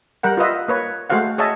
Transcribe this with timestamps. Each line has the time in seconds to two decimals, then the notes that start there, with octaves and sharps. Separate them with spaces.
0.23 G3 A#4 F#5 G5
0.37 F4 B4 D#5 E5
0.68 A#3 B4 C#5
1.10 G#3 A3 F#4 C5 F5 F#5
1.38 G#4 C#5 D#5 E5 A5